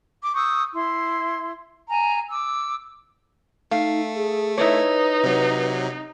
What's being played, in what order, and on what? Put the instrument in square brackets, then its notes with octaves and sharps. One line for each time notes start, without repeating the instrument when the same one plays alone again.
[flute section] D6
C#6 D#6 E6 G6
E4 C6
G#5 A#5
D6 E6
[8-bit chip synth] A3 [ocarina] D#4 [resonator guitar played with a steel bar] F5
[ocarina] G#4
[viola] D#4 [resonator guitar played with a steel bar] E4 C#5 [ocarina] B4
[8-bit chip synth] C3 F#3